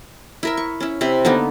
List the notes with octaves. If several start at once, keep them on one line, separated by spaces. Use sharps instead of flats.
E4 A#4 E5
C#6
C#4 E4
C3 E4 C5
D3 A#3 B3 D#4